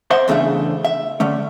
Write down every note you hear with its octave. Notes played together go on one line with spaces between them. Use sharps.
C5 D#5 E5 F#5 C6
E2 C#3 A3 D4 E5
E5
D3 A3 C#4